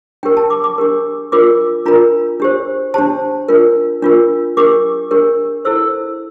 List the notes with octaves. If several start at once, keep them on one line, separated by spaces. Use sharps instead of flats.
D4 G4 A#4 G5
A5
D6
D6
D4 G4 A#4
D4 F4 A#4 D6
D4 F4 A#4 A#5
D4 G4 C5
D4 G4 C5 A5
D4 F4 A#4
D4 F4 A#4
D4 G4 A#4 D6
D4 G4 A#4
E4 A4 C5 E6